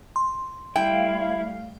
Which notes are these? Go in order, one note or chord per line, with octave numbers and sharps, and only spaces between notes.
C6
G3 A3 E4 F5 G5